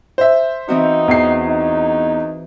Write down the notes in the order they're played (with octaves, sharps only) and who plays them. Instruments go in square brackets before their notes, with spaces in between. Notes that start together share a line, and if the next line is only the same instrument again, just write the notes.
[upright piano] C5 E5
[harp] E3 C4 F#4 [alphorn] D#4
[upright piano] E2 C7
[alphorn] D#4